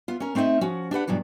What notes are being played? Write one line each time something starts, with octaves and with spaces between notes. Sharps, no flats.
B3 F4
C#4 A#4
A3 C4 D#4 E4 D#5 E5
F3 C#4 F#4
D4 G4 B4 F#5
G2 B2 E3 F#3 D4